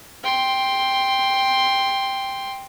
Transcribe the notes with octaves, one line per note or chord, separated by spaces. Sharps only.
G5 C6